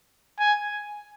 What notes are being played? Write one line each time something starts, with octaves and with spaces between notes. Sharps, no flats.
G#5